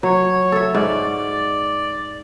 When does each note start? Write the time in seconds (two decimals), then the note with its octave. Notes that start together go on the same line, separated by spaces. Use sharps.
0.03 F#3 C#5
0.52 A4 E5
0.74 G#2 D5